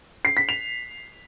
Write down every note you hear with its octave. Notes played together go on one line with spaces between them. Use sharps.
C7
B6
F7